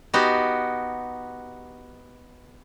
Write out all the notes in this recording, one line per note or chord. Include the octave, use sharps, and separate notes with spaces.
B3 D#4 F#4 G4